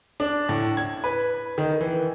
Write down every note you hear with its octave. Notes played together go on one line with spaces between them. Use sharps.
D4
A2
G#6
B4
D#3
E3